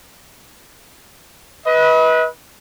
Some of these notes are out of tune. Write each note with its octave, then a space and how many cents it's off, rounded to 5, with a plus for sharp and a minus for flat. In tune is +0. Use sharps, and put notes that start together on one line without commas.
B4 -15 D#5 +40